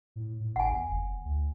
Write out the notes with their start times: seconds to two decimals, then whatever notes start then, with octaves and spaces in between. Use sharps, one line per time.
0.16 A2
0.40 A2
0.56 G#1 F#5 G#5
0.71 E2
0.88 F#1
1.25 D2